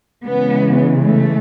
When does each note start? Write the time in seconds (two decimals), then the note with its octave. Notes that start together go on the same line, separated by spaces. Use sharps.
0.24 C#3 E3 G#3 B3
1.02 A3